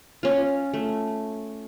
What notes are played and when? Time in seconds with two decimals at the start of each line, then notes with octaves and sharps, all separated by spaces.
0.23 C#4 F4
0.74 A3